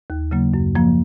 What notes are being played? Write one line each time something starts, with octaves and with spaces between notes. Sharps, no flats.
D#2
C#3 F#3 A#3
F#2
F3 A#3